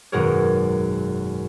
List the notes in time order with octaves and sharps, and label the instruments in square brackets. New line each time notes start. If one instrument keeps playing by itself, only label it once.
[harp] G#1 F#2 B2 G#4 A#4 C#5